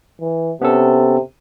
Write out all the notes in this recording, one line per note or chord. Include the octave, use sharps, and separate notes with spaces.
E3
C3 B3 C#4 A4